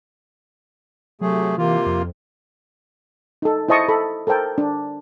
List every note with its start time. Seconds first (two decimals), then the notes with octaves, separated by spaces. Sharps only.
1.21 C3 F#3 A3 G#4
1.58 C3 E3 A#3 F4
1.86 F2
3.42 D#4 A4
3.68 E4 C5 D#5 A5 C#6
3.89 A4 B5
4.27 A4 A#4 C5 G5 A5
4.58 D4